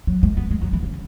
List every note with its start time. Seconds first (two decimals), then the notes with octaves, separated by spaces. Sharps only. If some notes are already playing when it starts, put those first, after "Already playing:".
0.07 F#3
0.23 G#3
0.37 B3
0.51 G#3
0.62 F#3
0.73 E3
0.83 C#3